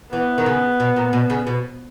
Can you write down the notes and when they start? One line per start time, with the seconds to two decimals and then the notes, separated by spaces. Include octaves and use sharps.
0.13 E3 B3
0.38 D#3
0.46 C#3
0.80 B2
0.96 A#2
1.13 B2
1.30 C#3
1.47 B2